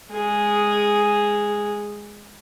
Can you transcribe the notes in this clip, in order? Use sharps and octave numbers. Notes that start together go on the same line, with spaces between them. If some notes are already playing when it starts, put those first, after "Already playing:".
G#3 G#4